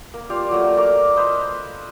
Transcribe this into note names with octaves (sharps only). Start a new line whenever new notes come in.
A#3
F4 G4 D5 F5
F#3 A3 A#3
A4 A#4 F5 D6
B4 C5 D#5 F5